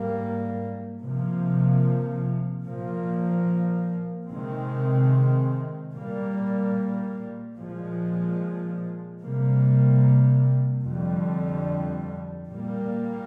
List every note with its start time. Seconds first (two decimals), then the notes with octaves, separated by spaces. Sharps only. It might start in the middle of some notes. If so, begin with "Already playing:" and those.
Already playing: G#2 G3 A#3
1.01 C3 F3 A#3
2.64 A#2 F3 A#3
4.28 C3 D#3 G#3 C4
5.92 A#2 G3 A#3
7.57 A#2 F3 G#3
9.21 C3 G3 A#3
10.84 F2 D3 G3
12.48 A#2 G3 A#3